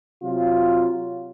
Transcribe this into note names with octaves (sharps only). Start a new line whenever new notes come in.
C3 F#3 F4